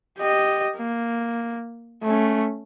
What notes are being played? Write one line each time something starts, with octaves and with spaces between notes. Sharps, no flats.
G4 D#5
A#3
A3 C#4